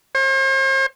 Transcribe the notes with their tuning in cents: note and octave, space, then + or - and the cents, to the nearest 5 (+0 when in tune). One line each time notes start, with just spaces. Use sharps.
C5 +45